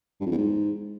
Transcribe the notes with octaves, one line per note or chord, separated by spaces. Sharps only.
G2
F2
E2
G#2